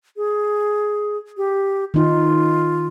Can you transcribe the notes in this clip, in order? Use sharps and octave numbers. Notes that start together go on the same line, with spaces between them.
G#4
G4
D#3 D#4 F4